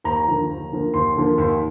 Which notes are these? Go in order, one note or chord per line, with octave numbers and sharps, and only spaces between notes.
D#2 A#5
D3 F3 A#3
D#2
D3 F3 A#3
D#2 C6
D3 F3 A#3
D#2